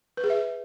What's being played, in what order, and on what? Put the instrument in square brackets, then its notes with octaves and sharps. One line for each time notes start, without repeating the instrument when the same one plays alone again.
[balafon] B4
G#4
E5